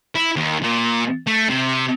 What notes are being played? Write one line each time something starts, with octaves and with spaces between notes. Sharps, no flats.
E4
D#2
A#2
A3
C3